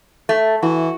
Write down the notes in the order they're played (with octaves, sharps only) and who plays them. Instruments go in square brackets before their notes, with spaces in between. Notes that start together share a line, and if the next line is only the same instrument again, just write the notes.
[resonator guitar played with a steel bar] A3
[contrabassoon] E3 [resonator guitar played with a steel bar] F#4